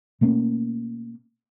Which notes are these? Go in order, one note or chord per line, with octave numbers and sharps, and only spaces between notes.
B2 A3 A#3 C#4